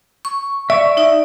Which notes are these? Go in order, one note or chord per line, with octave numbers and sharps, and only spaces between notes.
C#6
D5 E5 C#6
D#4 D5